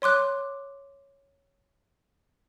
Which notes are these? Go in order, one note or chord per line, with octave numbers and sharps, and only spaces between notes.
C#5 C6 D6 F#6